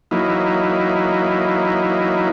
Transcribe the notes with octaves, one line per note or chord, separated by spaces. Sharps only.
E3 F#3 A#3 D#4 E4